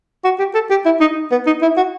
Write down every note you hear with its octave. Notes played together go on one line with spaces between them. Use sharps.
F#4
G4
A4
G4
E4
D#4
B3
D#4
E4
F#4